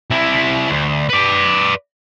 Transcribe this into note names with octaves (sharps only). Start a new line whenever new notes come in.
C3 E4
D2
B4 D5